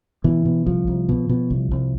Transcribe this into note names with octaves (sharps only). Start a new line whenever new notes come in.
B2 E3
B2
C2 F3
C2
B2
B2
C2
C2